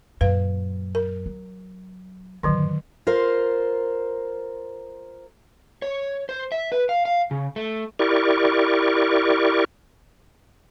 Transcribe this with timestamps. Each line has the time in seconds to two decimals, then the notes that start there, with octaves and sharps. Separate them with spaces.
0.21 F#2 A#2 B4 F5
0.95 A#4
1.26 F#3
2.43 F#2 A2 D3 D#3 F#3
3.07 F4 A#4 C5
5.82 C#5
6.29 C5
6.52 E5
6.72 B4
6.89 F5
7.05 F5
7.31 C#3
7.56 A3
7.99 E4 G4 A#4 D5 C#6